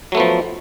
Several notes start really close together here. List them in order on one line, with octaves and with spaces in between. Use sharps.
F#3 A3 B3 F3